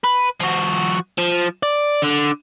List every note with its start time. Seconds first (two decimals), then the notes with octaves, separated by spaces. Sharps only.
0.04 B4
0.40 F3 F#4
1.18 F3
1.63 D5
2.02 D3